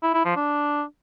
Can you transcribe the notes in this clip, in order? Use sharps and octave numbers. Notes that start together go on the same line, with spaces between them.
E4
E4
F3
D4